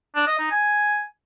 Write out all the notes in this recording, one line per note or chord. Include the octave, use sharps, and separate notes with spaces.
D4
D#5
D#4
G#5